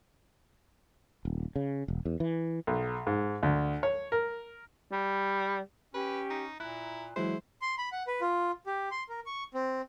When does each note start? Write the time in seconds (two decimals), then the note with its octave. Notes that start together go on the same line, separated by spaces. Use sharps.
1.25 D#1
1.56 C#3
1.88 E1
2.05 E2
2.20 E3
2.67 B1
3.07 G#2
3.43 D2
3.83 C#5
4.12 A#4
4.92 G3
5.94 C#4 G4 B4
6.30 D#4
6.60 A#2 E4 A#5 F#6
7.16 E3 F#3 G#3 E4 C5
7.62 C6
7.78 B5
7.92 F#5
8.07 B4
8.21 F4
8.66 G4
8.91 C6
9.09 A#4
9.26 C#6
9.54 C4